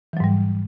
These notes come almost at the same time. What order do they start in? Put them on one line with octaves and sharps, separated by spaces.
E3 F#3 G#2 G3